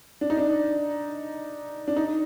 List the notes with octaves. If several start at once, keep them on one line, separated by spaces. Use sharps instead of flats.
D4
D#4
D4
D4
D#4